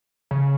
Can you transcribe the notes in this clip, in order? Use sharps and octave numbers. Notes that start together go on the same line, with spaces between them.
C#3